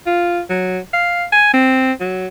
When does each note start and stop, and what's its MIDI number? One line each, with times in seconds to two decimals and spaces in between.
0.07 0.41 65
0.49 0.79 54
0.93 1.25 77
1.32 1.52 80
1.53 1.92 60
2.00 2.27 54